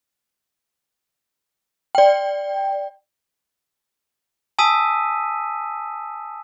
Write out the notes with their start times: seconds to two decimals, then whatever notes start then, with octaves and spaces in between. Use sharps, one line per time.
1.95 D5 G5
4.59 G#5 A5 D#6 E6 B6 D#7